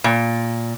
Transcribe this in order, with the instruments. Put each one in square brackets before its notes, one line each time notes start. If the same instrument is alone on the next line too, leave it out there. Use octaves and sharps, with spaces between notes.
[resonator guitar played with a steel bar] A#2